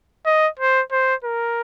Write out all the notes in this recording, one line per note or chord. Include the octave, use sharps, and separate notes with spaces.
D#5
C5
C5
A#4